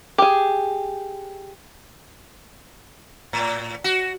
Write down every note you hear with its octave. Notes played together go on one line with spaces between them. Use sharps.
G4 G#4
A2
F#4